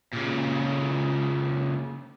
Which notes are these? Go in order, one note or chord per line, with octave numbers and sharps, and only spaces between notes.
A#2 C#3